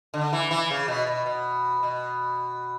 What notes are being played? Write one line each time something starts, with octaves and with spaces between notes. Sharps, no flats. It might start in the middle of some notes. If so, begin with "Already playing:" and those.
D3
E3
E3
C#3
B2
B2
B2
B2